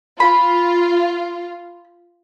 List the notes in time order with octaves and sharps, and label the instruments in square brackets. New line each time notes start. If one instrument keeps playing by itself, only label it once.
[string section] F4 [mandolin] B5